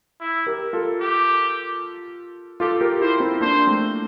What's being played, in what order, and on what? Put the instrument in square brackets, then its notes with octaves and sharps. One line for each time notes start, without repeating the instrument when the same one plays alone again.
[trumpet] E4
[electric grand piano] G4 A#4
F4 A4
[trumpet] G4
[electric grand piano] F4 A4 [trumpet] G4
[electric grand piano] G4 A#4
[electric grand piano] E4 G4 [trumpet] C5
[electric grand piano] C4 E4
[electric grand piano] A#3 D4 [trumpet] C5
[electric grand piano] A3 C4